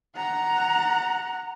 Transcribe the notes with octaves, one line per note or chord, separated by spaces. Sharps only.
F#5 A#5